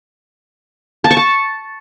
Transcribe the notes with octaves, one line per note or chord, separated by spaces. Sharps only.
A5
C#6
A5